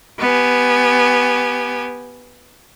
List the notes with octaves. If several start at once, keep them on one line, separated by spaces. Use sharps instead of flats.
B3 G4 G#5